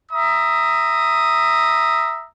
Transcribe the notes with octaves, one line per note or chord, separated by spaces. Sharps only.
E5 A#5 D#6